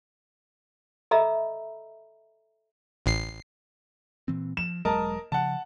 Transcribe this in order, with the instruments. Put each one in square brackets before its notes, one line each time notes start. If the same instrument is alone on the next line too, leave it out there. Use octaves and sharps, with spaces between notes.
[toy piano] A4 D#5 E5 A#5 B5 E6
[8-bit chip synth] A1 C7
[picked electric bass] A#2 E3 C4
[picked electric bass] F3 [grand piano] E7
[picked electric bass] E1 F#3 G#3 [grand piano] A#4 D#5 A5
[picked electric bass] C#3 F3 [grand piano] F#5 A5